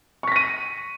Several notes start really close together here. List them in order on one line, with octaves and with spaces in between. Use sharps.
C#6 B6 A#6 D#7